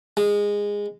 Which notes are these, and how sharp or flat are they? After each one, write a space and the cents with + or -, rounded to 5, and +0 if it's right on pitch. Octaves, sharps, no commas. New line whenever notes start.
G#3 -15